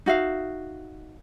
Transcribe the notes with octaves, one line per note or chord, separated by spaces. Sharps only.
D#4 F#4 E5 F5